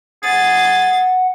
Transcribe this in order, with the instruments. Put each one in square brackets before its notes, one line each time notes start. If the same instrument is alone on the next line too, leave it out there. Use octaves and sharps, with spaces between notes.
[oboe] G#4 [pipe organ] F#5 [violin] A6